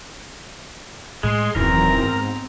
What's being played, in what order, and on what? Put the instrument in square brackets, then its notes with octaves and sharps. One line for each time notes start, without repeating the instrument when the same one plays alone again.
[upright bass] A2 A3 [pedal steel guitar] G#3 [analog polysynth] G#4 C6
[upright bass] D#1 [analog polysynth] F#2 D#3 E3 [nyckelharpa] C4 A#5 [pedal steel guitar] A#4
[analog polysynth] G#2 [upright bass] B3